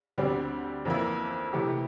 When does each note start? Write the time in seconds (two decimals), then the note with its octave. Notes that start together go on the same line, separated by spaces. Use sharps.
0.18 D2 D3 G3 C4 G4
0.85 F2 E3 A#3 E4
1.53 C3 E3 A3 E4 G4